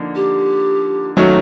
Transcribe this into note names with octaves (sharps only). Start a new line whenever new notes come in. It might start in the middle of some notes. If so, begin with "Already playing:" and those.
Already playing: D3 F3 A#3 D#4
G4
D#3 F#3 A3 C#4 F#4